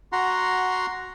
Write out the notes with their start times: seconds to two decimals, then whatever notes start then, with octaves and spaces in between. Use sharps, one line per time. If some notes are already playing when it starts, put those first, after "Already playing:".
0.12 F#4 F#5 A#5 C6